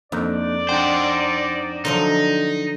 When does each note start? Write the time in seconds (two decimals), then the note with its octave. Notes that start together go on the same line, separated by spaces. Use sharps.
0.12 F2 A#3 D4 D#4 D5
0.69 D4 D#4 C5 F#5 G5
1.85 D3 F3 F#3 D#4